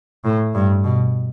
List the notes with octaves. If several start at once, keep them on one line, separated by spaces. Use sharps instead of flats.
A2
G2
B2